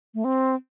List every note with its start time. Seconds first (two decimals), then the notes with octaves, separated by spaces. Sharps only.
0.14 A3
0.24 C4